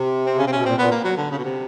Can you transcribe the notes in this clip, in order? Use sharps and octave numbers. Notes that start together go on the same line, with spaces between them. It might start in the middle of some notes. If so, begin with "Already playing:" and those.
Already playing: C3
C4
C#3 C#4
C3 C4
B2 C#4
A#2 C4
A#2 B3
A#3
F#3
D3
C#3
B2
C3